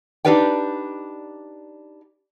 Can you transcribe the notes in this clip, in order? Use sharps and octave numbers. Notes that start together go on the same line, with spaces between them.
D4 D#4 G4 B4 D5 G5